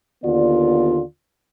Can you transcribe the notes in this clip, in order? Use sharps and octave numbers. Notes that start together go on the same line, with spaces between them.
D#2 D3 B3 F4 D5